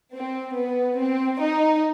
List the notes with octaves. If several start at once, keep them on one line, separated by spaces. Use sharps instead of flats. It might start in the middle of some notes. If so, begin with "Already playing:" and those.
C4
B3
C4
D#4